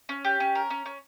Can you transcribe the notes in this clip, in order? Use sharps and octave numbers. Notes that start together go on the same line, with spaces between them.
C#4
G4
C#4
A#4
C#4
C#4